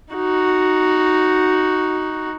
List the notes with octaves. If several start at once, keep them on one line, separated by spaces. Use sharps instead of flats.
D#4 F#4